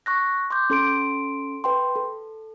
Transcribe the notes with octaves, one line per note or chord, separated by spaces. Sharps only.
C#6 F#6 A#6
C6 D6 G6
C#4 A4 C6 D7
B4 G5 C6
A4